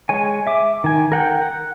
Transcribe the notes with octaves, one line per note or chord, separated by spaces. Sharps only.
G#3 C#5 G#5
E5 D6
D#3 G#5
A#4 F#5 G5
F#5